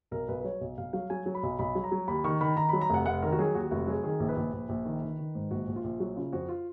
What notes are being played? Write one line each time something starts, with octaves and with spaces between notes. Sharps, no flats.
B1 A#4
B1 B4
B4
F#3 C#5
B1
B1 F5
F#3 F5
F#3 G#5
F#3
B5
B1
B1 B5
F#3
A#5
F#3
D#2 B5
D#3 C#6
D#3 B5
D#3 A#5
F#3 B5
A#5
F1 F#5
F1 F#5
D#3 A#4
F#4
F#3 G#4
D#2 F#4
F1 F#4
F#3 G#4
D#3 G#4
A#1
B4
A#1
A#1
A#1
D#3
D#3
D#3
G#2
A#1 F#4
A#1
F4
A#1
F#3 F#4
C#3 F4
F2 F#4
F4